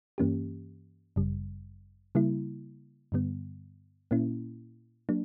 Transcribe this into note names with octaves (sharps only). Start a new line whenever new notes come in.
G2 E3 A#3 C#4 G4
G1 F#2 C#3 G3
C#3 G3 A#3 E4
G2 D3 G3 B3
A#2 A#3 C#4 E4
F#3 A#3 D4